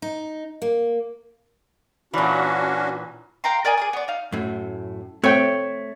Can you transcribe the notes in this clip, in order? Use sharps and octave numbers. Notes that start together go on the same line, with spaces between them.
D#4
A#3
A#2 E3 C#4 D4 F#4
F5 G5 A#5 C6
A#4 D5 D#5 G#5
G#4 D5 D#6
B3 D5
D#4 F5
F#2 A2
A3 C4 C#5 G5